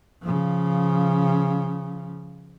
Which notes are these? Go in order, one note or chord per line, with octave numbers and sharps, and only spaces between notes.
C#3 F3